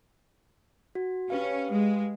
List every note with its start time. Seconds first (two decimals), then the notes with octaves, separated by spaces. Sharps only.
0.95 F#4
1.30 C#4 G4 B4 F5
1.71 G#3